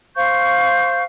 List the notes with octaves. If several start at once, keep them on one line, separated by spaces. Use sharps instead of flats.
C5 F5 C#6 G6